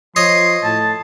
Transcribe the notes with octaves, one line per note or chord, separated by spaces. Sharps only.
F3 C#5 D#5 C6
A2 A5